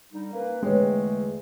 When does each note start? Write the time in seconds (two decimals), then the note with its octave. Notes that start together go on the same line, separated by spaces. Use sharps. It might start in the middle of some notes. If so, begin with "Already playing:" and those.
0.13 D3 G3 D#4
0.34 A#3 C#4 B4
0.63 E2 D3 G#3 A3 B4 C#5 G5